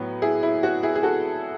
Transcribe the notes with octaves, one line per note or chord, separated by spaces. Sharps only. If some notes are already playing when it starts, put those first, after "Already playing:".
Already playing: A2 F#3 B3
E4 G#4
E4
F#4
E4 G#4
G#4
F#4 A4